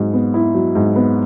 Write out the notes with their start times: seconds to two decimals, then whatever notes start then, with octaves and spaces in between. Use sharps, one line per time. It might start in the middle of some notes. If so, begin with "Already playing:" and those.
Already playing: G#2 F#3
0.14 B3
0.34 E4
0.54 F#3
0.75 G#2
0.96 B3